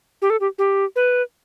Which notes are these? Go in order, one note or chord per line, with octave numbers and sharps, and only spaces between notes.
G4
A4
G4
G4
B4